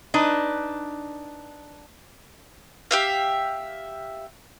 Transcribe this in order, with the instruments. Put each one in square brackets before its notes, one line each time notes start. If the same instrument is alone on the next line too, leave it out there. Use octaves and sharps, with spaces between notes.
[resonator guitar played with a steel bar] D4 D#4 B4
[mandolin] G4 E5 F5